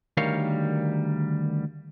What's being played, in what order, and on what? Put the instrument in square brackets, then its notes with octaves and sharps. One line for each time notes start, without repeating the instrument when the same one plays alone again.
[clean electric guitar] D2 D#3 G3 A#4 C#5 F5